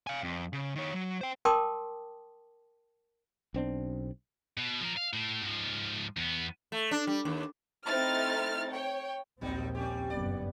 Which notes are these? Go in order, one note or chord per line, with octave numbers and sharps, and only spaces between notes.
F5 G#5
F2
C#3
D#3 C#5
F#3
C5 G5
A#4 G5 A5 C6 D6 D#6
B1 C4 D4
B2
F3 A#4
F5
A2
G#2 F3
E2 B3
A3
D4
G3
D#2
A3 C4 D#4 E4 F6 A6
C#5 G5
A#1 D#2 F#3 G3 C4 D#4
G3 C#4 G4
F#1 G2 B3 D5